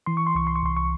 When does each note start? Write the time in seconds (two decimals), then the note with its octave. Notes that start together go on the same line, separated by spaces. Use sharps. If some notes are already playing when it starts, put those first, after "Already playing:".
0.06 E3 C6
0.17 C#6
0.27 C6
0.35 C2 C#6
0.47 C6
0.56 C#6
0.63 C2 C6
0.77 C#6